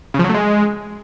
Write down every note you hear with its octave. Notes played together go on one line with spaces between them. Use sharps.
C#3
F3
F#3
A3
G#3